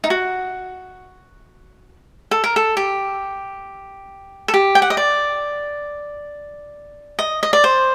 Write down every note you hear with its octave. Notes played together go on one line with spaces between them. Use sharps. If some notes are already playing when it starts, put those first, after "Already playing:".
D#4
F#4
A4
A#4
A4
G4
A4
G4
G5
F#5
D#5
D5
D#5
D#5
D5
C5